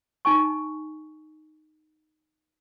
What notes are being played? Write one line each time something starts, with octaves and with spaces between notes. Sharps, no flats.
D#4 G#5 C#6